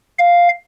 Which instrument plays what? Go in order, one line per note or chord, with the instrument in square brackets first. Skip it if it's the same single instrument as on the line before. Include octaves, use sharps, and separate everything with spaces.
[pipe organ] F5